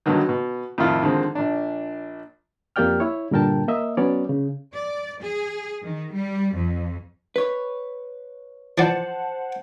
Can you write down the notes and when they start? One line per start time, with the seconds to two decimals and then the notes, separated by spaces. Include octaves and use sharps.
0.06 G2 B2 D3 D#3 F#3
0.29 B2
0.78 F2 A2 D#3 E4 F4 F6
1.03 D3 D#3 F3 G#3 C4
1.35 A#1 D4
2.76 F2 A#3 G4 D5 G5 F6
3.00 E4 C#5
3.31 G2 A#2 D3 A#4 G5 A5
3.68 A#3 D#5 E5
3.97 F#3 B3 C#4 C#5 D5
4.29 C#3
4.74 D5
5.20 G#4
5.82 D#3
6.13 G3
6.53 F2
7.36 B4 C#5
8.78 E3 F3 C5 D5 F#5 A5